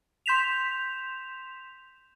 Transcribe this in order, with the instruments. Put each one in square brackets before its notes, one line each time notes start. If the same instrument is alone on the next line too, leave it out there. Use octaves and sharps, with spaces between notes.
[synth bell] C6 G6 B6 E7 F7